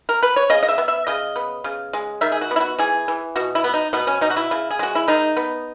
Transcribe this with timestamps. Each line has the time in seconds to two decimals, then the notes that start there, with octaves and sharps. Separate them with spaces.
0.09 A#4
0.23 B4
0.36 C#5
0.50 C#3 D#5
0.63 D#5
0.68 E5
0.78 B3
0.88 E5
1.07 C#3 D#5
1.36 B3
1.64 C#3
1.93 G#3
2.21 D#3 E5
2.32 G#4
2.41 F#4
2.51 B3
2.56 E4
2.60 F#4
2.79 E3 G#4
3.08 E3
3.36 B2 F#4
3.55 E4
3.64 B3
3.74 D#4
3.93 B2 B3
4.07 C#4
4.21 B2 D#4
4.30 F#4
4.37 E4
4.51 C#3
4.71 G#4
4.79 G#3 F#4
4.95 E4
5.08 D#3 D#4
5.37 B3